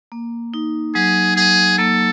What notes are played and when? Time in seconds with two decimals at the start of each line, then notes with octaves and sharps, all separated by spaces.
0.12 A#3
0.54 D#4
0.95 F#3 G#4
1.37 F#3 G#4
1.78 A#3 A4